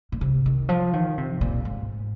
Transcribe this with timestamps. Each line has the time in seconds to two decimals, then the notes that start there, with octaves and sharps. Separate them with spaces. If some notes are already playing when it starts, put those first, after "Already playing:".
0.12 A#2
0.21 C3
0.46 D#3
0.69 F3
0.93 D#3
1.18 C3
1.41 A#2
1.65 G#2